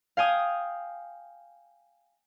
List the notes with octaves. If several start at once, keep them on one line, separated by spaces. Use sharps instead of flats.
F5 G5 G#5 D#6